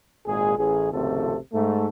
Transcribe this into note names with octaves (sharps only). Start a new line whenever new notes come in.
G#1 A#2 G#3 G#4
A1 G#4
G#1 C#2 C3 F3 A3 A4
G#2 A3